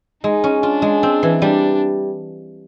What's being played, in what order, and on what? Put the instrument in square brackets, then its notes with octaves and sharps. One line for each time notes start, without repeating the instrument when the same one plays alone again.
[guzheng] G#3 [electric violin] D#4
[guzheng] C#4
[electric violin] D4 [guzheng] F4
[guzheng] G#3
C4
E3
[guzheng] G3 [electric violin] D4